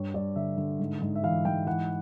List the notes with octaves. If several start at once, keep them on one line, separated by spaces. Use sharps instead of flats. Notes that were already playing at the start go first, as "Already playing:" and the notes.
Already playing: G2 C#5
G2 D5
D3 E5
D3
G#2
G#2
E5
E3 F5
G#2 G5
E3 F#5